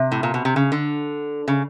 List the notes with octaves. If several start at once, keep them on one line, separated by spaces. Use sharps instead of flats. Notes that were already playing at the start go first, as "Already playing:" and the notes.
Already playing: C3
A2
A#2
B2
C3
C#3
D3
C#3